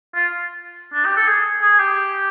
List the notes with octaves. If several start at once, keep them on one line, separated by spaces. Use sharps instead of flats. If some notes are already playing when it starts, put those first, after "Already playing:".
F4
D4
G4
A4
G#4
G#4
G4